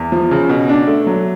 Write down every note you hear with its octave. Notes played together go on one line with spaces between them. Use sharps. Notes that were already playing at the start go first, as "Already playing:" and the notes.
Already playing: E2
F3
C#3
B2
D4
A3
F#3